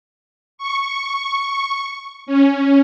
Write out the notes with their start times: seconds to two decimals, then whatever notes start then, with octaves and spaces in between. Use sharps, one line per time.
0.58 C#6
2.26 C#4